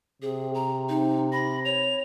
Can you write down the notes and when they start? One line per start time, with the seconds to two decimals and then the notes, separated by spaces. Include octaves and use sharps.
0.22 C3 G#4
0.54 A#5
0.89 D#4
1.32 B5 A#6
1.65 C#5 F7